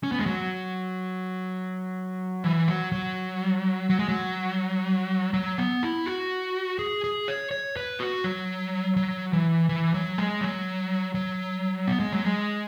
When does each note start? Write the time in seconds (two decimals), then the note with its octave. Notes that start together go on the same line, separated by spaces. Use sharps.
0.03 C#4
0.12 B3
0.19 G#3
0.26 F#3
2.44 E3
2.68 F#3
2.92 F#3
3.90 F#3
3.99 G#3
4.09 F#3
5.34 F#3
5.58 B3
5.83 E4
6.06 F#4
6.79 G#4
7.04 G#4
7.28 C#5
7.51 C#5
7.76 B4
8.00 F#4
8.24 F#3
8.97 F#3
9.33 E3
9.69 E3
9.94 F#3
10.18 G#3
10.41 F#3
11.15 F#3
11.87 B3
12.00 G#3
12.13 F#3
12.25 G#3